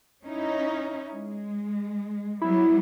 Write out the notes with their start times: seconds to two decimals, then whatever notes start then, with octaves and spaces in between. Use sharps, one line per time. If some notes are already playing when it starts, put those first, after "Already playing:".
0.24 C#4 D#4 E4
1.12 G#3
2.41 F#3 G3 B3 E4